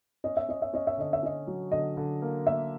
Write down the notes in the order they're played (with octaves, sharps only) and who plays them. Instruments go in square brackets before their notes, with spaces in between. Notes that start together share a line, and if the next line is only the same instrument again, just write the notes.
[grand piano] C#4 [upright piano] D#5
[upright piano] E5
[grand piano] C#4 [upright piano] D#5
[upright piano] E5
[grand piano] C#4 [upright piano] D#5
[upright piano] E5
[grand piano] D3 [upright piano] D#5
[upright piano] E5
[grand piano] C#4 [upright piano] D#5
[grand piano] F#3
[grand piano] D3 [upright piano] D#5
[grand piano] D3
A#3
[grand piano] A#3 [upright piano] E5